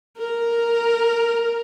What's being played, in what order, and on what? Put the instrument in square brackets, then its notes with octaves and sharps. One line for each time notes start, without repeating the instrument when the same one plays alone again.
[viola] A#4